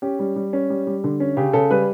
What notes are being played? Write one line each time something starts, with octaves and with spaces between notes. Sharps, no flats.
C#4 G4
G3
G3
C#4
G3
G3
D3
C#4
C#3 G4
C#3 A4
G3 B4